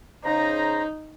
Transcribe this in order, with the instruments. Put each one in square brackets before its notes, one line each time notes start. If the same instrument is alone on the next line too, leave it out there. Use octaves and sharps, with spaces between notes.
[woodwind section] C#3 C5 A#5 [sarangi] D#4